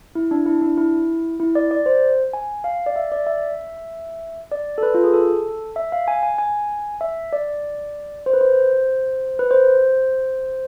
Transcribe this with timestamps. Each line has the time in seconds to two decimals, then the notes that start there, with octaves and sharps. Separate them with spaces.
0.15 E4
0.31 D4
0.46 E4
0.62 D4
0.78 E4
1.40 E4
1.55 D5
1.71 D5
1.86 C5
2.33 G#5
2.64 F5
2.86 D5
2.96 E5
3.12 D5
3.27 E5
4.52 D5
4.78 A4
4.83 B4
4.94 F4
5.04 G#4
5.13 A4
5.76 E5
5.92 F5
6.08 G#5
6.23 G#5
6.38 G#5
7.01 E5
7.32 D5
8.26 C5
8.33 B4
8.41 C5
9.39 B4
9.51 C5